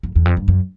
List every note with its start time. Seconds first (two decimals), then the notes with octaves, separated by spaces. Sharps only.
0.03 F2
0.16 E2
0.25 F2
0.37 G2
0.48 F#2